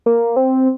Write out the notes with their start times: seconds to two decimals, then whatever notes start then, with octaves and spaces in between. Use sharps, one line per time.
0.06 A#3
0.36 C4